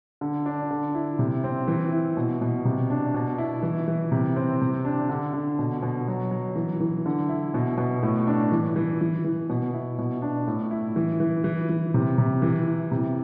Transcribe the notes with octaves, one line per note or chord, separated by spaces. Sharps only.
D3
D4
D3
E4
C3
C4
E3
E4
B2
B2
C3
D4
B2
E4
E3
E3
C3
C4
C3
D4
D3
D3
B2
B2
F#3
F#3
E3
E3
D3
E4
B2
B2
A2
D4
E3
E3
E3
E3
B2
E4
B2
D4
A2
E4
E3
E3
E3
E3
C3
C3
E3
E4
C3